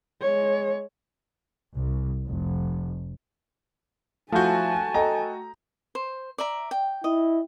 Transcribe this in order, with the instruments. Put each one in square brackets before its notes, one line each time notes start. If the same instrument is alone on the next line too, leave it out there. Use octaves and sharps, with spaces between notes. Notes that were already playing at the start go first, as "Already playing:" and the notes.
[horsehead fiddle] G#3 C#5
[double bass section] C2
F1
[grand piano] F3 E4 G6 [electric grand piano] A3 F#4 [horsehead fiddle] G#5 A5
[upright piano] A4 D#5 G5 [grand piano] A#5
[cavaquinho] C5
D5 E5 A#5
G5
[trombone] E4 [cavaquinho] D#5